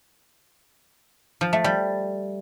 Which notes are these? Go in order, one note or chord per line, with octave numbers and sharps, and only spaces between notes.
F3
A3
G3